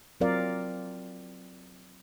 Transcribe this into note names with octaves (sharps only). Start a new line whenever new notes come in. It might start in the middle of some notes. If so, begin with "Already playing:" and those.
F#3 C4 F4 A#4 D5 F5